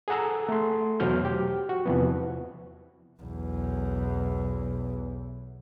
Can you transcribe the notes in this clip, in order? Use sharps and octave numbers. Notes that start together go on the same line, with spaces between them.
G#4 A4 F#5 A#5 E6
A3 C6
E2 B2 F#3 C5 F6 G6
G4
F#4
E2 C3 E3 F3 B3
B1 E2